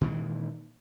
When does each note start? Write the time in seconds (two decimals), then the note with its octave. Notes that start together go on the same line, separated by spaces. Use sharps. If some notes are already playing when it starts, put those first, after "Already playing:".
0.01 A#2 D#3 E3 G#3